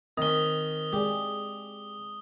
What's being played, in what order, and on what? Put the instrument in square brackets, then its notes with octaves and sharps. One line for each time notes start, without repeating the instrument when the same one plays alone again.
[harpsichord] D#3 C#4 [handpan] C4 [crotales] D#6 G7
[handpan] G#3 G#4 D5 [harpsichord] G4